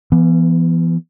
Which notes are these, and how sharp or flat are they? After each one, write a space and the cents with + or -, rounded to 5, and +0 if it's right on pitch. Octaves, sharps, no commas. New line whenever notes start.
E3 +35 B3 +0